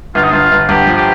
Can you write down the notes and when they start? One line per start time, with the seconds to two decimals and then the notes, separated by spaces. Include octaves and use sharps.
0.15 G1 F4
0.23 D#4
0.31 G1 F4
0.51 G1
0.69 G1 G4
0.87 F3
0.96 G4